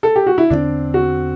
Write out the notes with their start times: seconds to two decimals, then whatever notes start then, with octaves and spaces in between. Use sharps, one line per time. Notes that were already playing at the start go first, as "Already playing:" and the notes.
0.03 A4
0.16 G4
0.27 F#4
0.38 E4
0.50 E2 D3 A3 C4 D4
0.94 F#4